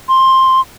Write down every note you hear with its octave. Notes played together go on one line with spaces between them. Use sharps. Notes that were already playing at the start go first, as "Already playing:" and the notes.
C6